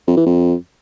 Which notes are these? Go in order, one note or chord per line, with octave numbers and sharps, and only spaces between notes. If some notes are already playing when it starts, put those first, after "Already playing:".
F2
E3
F2